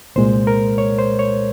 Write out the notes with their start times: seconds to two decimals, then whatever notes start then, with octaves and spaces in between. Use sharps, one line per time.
0.16 C2 A#2 G#3 C5
0.47 A#4
0.78 C#5
0.98 C5
1.19 C#5